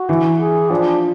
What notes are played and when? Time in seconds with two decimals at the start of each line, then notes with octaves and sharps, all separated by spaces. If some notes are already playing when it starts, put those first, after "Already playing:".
Already playing: F#4
0.09 E3
0.40 G#4
0.70 F3 D4